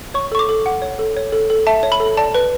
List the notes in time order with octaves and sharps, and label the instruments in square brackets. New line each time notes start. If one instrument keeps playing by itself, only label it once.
[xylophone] C#5 C#6
A4 C#6
D6
A4
F#5
C#5
A4
C#5
A4
A4
E5 A5
C#5
B5
A4
D5 A5
B4